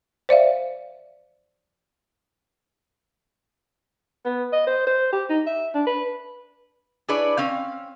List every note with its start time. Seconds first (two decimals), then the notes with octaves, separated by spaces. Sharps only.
0.29 C5 D5 E5 F5
4.25 B3
4.52 D#5
4.67 C5
4.87 C5
5.13 G4
5.29 D#4
5.46 E5
5.74 D4
5.86 B4
7.08 D4 E4 G#4 B4 C#5 D5
7.37 C4 C#4 F5